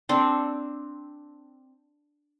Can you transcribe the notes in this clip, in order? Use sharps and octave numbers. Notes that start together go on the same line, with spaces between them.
C4 D4 A4 C5